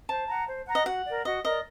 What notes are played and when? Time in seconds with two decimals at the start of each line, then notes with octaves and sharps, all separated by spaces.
0.09 C5 A5
0.28 F#5 A#5
0.48 C5
0.67 F#5 A#5
0.75 D#5
0.86 F#4 F#5
1.06 A#4 D5
1.25 F#4 D#5
1.44 A#4 D5 D#5